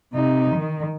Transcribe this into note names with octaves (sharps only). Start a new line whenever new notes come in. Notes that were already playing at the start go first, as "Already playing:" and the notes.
C3 D#4
D#3